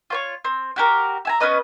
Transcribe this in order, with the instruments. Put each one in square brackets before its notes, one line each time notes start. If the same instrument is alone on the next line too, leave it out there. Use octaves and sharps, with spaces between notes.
[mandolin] F4 C5 C#5
C4
F#4 G4 A#4
E5 G#5 A#5
B3 C#4 B4 D#5